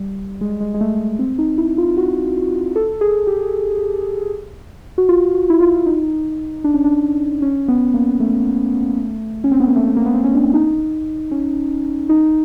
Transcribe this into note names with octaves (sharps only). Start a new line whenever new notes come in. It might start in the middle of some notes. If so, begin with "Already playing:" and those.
Already playing: G3
G#3
G#3
G#3
A3
C4
D#4
E4
F4
F#4
A4
G#4
G4
F#4
F4
F#4
E4
F4
D#4
D4
C#4
D4
C#4
B3
A#3
A3
C#4
C4
B3
A#3
A3
A3
A#3
B3
C4
C#4
D4
D#4
C#4
D#4